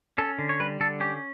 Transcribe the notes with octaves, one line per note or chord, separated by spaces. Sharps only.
C#4 A4
D3
C#5
G3 B4
D3 A4
C#4 G4